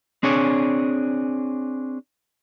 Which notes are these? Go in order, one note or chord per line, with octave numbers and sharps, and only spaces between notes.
C4 D4 G#4 C#5